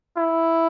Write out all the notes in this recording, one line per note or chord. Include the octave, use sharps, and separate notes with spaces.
E4